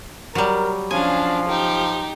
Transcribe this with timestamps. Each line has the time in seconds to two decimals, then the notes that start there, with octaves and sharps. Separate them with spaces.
0.35 F#3 G3 A#4
0.91 F3 C#4 D4 F5 G#5
1.49 D#4 G4